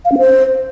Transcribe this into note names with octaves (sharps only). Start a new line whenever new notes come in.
F5
C#4
C5